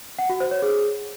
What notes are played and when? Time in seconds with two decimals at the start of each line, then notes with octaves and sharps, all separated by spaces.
0.19 F#5
0.29 F#4
0.40 C5
0.51 C#5
0.62 G#4